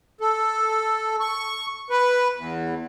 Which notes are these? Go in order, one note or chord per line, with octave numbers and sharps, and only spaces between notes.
A4
C#6
B4
E2